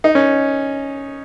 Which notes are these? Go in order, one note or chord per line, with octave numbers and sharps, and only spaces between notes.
D#4
C#4